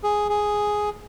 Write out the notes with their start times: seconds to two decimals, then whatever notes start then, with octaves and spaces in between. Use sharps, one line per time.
0.03 G#4
0.29 G#4